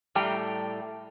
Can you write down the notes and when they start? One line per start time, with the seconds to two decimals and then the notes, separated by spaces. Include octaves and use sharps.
0.15 A2 G3 A3 G4 G5 A#5